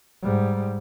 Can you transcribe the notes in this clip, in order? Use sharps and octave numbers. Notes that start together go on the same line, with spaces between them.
G#2 G3